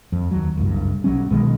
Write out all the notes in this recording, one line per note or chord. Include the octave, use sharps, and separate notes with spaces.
F2
D#2 F#3
F#1 C2 G2
B1 F#3 G3 C#4
B1 B2 D#3 G#3